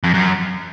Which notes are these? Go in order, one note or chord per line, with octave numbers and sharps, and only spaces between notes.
F2
F#2